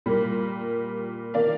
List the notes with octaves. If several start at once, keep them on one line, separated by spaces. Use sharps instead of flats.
A#2 G3 A#3
D#3 A#3 D5 F5